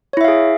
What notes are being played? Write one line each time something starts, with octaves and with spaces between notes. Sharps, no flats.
E4 G#4 C#5 E5 F5